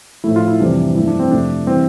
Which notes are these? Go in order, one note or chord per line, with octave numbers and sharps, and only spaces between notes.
A2 F3 A3 E4
F4
E4
F2 C3 E3 G3 D4
G2 F3 A3 E4
D4
C4
F2 C3 F3 A3 D4
E3 G3 C4